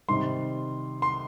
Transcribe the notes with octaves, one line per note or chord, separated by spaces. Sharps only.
C3 D#3 G3 C6
C6